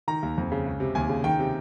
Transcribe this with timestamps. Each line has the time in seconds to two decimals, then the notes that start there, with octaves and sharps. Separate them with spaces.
0.08 D#3 A#5
0.23 D#2
0.38 F2
0.52 C#3
0.66 C#2
0.80 C3
0.95 D#2 G#5
1.09 C#3
1.24 D#3 G5
1.39 C3